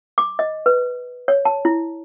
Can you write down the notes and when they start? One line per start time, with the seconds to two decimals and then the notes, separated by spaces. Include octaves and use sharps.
0.18 D6
0.39 D#5
0.66 B4
1.28 C#5
1.45 A5
1.65 E4